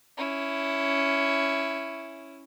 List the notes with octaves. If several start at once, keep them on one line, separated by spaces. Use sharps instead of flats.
C#4 E4